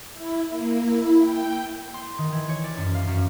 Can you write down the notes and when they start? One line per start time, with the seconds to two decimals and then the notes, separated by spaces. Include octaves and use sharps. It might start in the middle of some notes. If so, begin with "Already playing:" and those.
0.13 E4
0.49 A#3
0.84 E4
1.20 G5
1.94 C6
2.18 D#3
2.32 E3
2.49 C#5
2.64 D5
2.77 F#2
2.95 F5
3.07 F#2